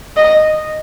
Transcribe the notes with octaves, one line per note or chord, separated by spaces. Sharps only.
D#5